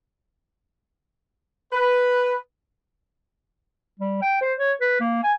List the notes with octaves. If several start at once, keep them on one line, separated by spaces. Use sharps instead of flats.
B4
G3
G5
C5
C#5
B4
A#3
G#5